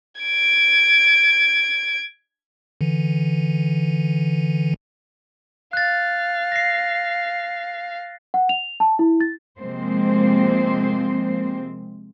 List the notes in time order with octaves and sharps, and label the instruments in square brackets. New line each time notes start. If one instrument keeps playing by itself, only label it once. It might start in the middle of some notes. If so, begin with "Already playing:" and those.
[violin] G#6 D7
[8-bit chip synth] D3 E3
[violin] F5 [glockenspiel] F#6 A6
[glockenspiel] A#6 C7
[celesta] F#5
F7
A5
E4
A6
[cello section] C3 F3 G#3 A#3 C4 C5